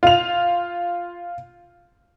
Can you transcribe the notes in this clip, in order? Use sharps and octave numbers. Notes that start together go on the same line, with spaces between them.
F4 F7